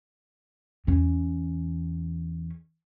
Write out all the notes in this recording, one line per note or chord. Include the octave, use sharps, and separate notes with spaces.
E2 C#4